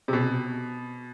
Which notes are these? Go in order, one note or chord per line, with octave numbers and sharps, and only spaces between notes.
C3
B2